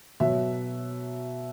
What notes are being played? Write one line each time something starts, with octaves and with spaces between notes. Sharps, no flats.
B2 F#3 E5